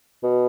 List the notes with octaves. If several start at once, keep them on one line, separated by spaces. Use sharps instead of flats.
B2